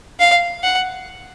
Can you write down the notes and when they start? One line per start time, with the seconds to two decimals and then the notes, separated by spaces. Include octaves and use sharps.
0.19 F5
0.63 F#5